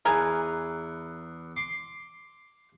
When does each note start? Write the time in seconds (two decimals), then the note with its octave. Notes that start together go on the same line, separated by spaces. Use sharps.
0.05 E2 A#4 B4 G#5
1.56 C6 D6